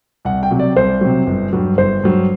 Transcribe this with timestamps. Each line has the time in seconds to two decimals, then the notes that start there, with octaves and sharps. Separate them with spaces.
0.25 C2 F#5
0.43 G5
0.51 C3 F#3
0.59 D5
0.76 C2 C5
1.01 C3 F#3
1.27 G1
1.53 G2 F#3
1.78 G1 C5
2.03 G2 F#3